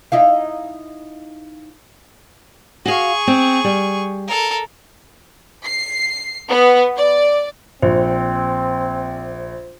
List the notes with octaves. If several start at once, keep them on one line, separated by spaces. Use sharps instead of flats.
D#4 E4 F5
F#4 G#4 F5 C#6
C4
G3
A4 A#4
C7
B3
D5
A#1 C4 C5